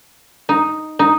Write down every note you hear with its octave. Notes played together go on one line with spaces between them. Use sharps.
D#4
D#4